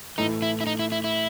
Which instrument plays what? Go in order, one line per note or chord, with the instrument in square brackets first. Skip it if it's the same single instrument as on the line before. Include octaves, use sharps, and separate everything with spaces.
[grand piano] A2 E3 A3 [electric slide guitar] D#4
[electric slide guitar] E4
E4
D#4
E4
E4
E4